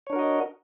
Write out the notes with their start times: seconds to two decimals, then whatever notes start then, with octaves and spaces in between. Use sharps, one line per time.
0.07 C#5
0.10 D4
0.13 A#4
0.16 F#4
0.19 D#5